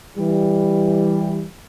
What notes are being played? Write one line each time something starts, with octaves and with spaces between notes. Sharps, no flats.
E3 G3